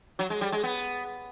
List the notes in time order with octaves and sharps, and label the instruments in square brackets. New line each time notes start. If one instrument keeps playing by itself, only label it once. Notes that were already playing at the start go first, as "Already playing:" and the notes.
[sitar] F#3
G#3
G3
G#3
B3